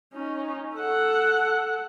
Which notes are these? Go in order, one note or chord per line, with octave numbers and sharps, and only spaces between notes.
C#4 D#4
A4 F#5